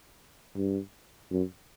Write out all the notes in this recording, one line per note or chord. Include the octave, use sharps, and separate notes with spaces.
G2
F#2